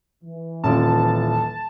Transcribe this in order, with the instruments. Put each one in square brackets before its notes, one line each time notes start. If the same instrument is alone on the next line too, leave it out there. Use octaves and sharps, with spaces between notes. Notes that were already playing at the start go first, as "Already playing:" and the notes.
[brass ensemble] E3
[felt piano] D#1 [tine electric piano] C4 F4 [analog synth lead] A5